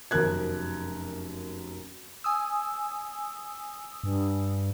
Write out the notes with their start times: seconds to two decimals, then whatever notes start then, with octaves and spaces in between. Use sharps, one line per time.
0.11 F1 F#2 A#4 F#6 G#6
2.24 G#5 D#6 E6
4.04 G2